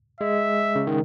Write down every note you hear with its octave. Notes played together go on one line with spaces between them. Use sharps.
G#3 E5
C#3
D#3